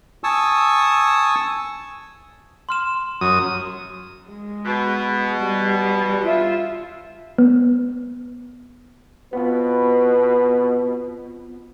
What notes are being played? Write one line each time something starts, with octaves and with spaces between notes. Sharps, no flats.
G#5 A5 C#6 D#6 E6
C6 F6 E7
F#2 D#6
G#3
B2
G3
F4 E5
B3
B2 B3 C4 F4 B4